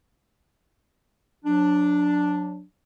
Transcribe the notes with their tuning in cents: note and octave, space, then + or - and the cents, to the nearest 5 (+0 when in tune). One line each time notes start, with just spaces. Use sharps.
F#3 -30 D4 +0